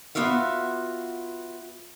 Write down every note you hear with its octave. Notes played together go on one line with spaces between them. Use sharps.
B3 F4 F#4 E5 F5